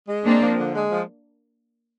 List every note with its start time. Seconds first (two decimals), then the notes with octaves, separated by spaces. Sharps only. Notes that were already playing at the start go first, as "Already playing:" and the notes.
0.08 G#3
0.25 A#3 C4 D4
0.42 F3
0.58 D3
0.75 G#3
0.92 F3